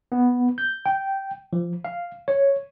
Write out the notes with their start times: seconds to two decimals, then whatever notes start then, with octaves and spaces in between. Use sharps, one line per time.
0.12 B3
0.58 G6
0.86 G5
1.53 F3
1.85 F5
2.28 C#5